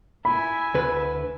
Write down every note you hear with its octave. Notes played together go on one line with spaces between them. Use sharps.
E4 G#5 B5
D2 B4